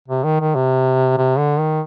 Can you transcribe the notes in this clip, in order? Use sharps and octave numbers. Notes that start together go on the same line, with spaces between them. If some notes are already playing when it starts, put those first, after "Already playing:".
C3
D#3
D#3
C3
C3
D3
D#3